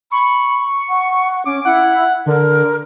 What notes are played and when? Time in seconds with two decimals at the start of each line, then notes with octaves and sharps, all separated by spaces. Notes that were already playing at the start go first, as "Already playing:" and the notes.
0.12 B5 C#6
0.89 F#5
1.45 C#4 D6
1.65 E4 F#5
2.26 D3 A#4